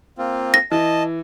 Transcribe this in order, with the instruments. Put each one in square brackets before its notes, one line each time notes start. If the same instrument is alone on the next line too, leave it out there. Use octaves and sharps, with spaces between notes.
[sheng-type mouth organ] A#3 C4 F4
[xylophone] A#6
[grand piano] E3 [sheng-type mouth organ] D#5 A5